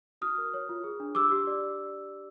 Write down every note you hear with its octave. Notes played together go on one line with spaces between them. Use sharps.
F#4 D#6 F6
A#4
C#5
F4
G#4
D4
G4 D6 E6
G4
D5